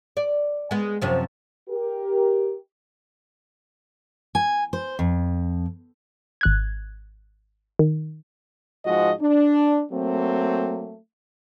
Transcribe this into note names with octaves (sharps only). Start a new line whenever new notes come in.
D5
G#3 B3
F#2 C3 F3
G4 A#4
G#5
C5
F2
G#1 F#6 G#6
D#3
G#2 F3 G#3 F#4 D#5
D4
F#3 A3 A#3 C4